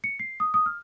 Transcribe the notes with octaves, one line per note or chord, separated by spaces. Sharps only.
C#7
C7
D#6
D#6
F6